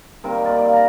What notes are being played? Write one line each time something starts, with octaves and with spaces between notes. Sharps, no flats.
C3 D#3 G3 A#3 A#4
D5
D5
F5
A#5